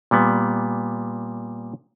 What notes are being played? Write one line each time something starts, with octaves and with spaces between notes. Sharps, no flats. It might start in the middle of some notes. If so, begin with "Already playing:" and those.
A#2 G3 B3